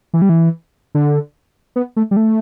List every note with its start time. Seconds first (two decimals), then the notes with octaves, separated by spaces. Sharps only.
0.14 E3
0.22 G3
0.29 E3
0.95 D3
1.76 B3
1.96 A3
2.11 G3
2.17 A3